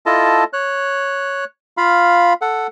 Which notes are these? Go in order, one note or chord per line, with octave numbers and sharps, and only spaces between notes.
E4 F4 A4 D#5 A5
C#5 F#6
F4 F5 B5
A4 F#5